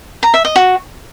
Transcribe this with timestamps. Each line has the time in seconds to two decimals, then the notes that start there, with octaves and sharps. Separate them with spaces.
0.23 A#5
0.34 E5
0.45 D#5
0.56 F#4